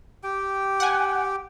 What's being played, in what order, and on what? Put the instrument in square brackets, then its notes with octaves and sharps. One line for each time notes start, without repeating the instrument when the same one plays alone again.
[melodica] G4 G5
[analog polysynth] F#5 G#5